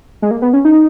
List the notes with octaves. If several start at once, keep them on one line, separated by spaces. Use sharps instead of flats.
G#3
A#3
B3
C#4
D#4